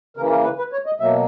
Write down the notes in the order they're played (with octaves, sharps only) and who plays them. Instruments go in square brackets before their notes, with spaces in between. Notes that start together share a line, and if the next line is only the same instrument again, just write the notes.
[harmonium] C#3 E3 A#3 A#4
A#4
B4
B4
C#5
D#5
B2 F#3 A#3 E5